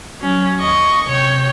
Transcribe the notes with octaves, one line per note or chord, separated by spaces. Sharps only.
F#3 C#4
D#2 D#5 C#6
C3 C#5 G5